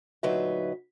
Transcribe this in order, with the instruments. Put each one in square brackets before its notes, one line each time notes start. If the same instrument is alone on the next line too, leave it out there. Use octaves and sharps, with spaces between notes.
[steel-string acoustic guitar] D2 A#2 F#3 D#4 B4 E5